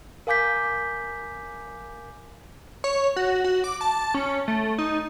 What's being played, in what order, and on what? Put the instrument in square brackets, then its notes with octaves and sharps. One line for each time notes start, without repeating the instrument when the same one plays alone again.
[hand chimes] A#4 F5 G#5 D6 G6 B6
[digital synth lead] C#5
F#4
F#4
D6
A5
C#4
A3
D#4